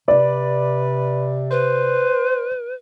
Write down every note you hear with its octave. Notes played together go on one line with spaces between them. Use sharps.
C3 B4 D5
B4 C5